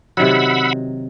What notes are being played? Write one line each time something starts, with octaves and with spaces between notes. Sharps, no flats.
C3 D#3 F#3 F#5 B5 E6